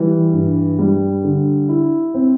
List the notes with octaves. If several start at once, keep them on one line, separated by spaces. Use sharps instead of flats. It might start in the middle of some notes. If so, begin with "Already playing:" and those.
Already playing: E3 G3
G2
G3
D3
E4
C4